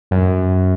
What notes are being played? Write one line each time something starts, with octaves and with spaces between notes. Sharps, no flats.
F#2